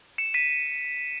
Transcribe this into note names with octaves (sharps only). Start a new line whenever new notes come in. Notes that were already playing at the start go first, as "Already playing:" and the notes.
C#7 E7
B6 D#7